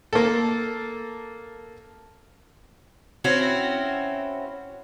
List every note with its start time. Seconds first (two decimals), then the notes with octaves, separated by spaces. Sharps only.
0.13 A#3 A4
3.24 C4 C#4 E4 F#4